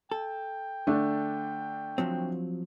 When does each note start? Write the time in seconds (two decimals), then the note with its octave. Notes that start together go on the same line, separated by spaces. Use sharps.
0.12 A4 G5
0.87 D3 A3 D4
1.98 F3 F#3 C4